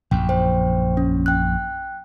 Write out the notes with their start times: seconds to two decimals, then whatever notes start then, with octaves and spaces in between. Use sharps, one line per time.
0.11 A#1 F#2 G5
0.29 C5 G5
0.97 C#4
1.26 G5 F#6